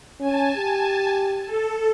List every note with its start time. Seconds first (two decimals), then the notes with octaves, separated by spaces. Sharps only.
0.20 C#4 G#5 A5
0.57 G4
1.46 A4